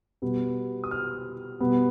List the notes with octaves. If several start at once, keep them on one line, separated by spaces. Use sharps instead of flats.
B2 G3 B3
D#6
F6
B2 G3 B3